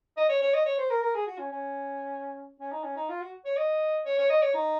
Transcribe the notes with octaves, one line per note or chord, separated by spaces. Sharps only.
D#5
C#5
C#5
D#5
C#5
C5
A#4
A#4
G#4
F#4
C#4
C#4
C#4
D#4
C#4
D#4
F4
F#4
C#5
D#5
C#5
C#5
D#5
C#5
D#4